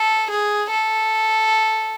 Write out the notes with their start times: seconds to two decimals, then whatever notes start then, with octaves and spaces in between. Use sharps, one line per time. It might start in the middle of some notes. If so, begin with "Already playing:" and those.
Already playing: A4
0.31 G#4
0.70 A4